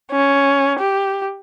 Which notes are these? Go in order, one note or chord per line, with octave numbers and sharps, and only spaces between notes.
C#4
G4